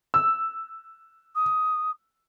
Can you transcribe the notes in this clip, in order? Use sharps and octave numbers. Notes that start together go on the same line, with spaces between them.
E6
D#6